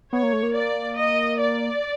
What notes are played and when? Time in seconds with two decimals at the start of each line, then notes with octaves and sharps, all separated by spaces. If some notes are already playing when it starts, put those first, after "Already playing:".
0.13 B3 C#5
0.23 A#3
0.33 A3
0.43 A#3
0.56 D5
0.98 D#5
1.41 D5